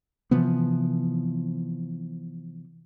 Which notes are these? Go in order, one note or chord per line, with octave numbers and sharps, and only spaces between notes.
C3 E3 F3 B3